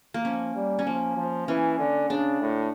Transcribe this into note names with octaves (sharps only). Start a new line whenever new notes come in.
A#3
F3 C#4
G3
C#4
F3 A#3
F3
E3 C#4
D3
C#3 D4
A2